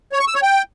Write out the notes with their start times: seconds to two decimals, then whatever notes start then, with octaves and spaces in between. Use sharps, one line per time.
0.12 C#5
0.20 C#6
0.27 E6
0.35 C#5
0.42 G5